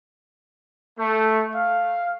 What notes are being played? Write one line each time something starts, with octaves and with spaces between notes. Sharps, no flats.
A3
F5